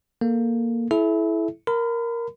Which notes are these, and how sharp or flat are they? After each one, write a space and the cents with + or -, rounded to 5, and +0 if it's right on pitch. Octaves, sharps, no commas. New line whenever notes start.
A#3 +0 A4 +0
E4 +0 A4 -40 E5 +0
A#4 +0 B5 +40